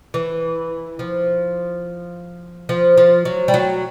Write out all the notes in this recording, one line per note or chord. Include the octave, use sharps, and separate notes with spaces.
E3
F3
F3
F3
F#3
G3
F#3